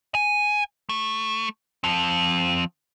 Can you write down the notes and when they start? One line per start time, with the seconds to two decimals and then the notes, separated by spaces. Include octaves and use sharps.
0.15 G#5
0.89 A3
1.84 F3 C4